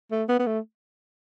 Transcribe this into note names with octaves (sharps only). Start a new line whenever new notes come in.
A3
B3
B3
A3